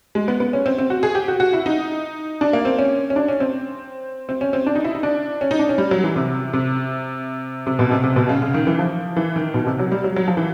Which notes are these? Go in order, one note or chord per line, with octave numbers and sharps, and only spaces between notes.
G#3
B3
B3
C#4
C4
C4
F#4
G#4
G4
F#4
F#4
E4
D#4
D4
A#3
C4
C#4
C#4
D4
C#4
C4
C4
C#4
C4
D4
D#4
E4
D#4
D4
C#4
D#4
D4
C#4
G3
F#3
E3
C3
C3
C3
B2
C3
C3
B2
C#3
C#3
D#3
E3
F3
E3
D#3
B2
C3
F#3
G3
F#3
F#3
F3
E3